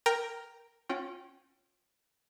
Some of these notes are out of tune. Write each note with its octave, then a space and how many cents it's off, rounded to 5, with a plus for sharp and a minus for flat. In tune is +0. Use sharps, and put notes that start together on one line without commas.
A#4 +0 G5 -5 A#5 +0
C#4 -15 F4 +35 G5 -20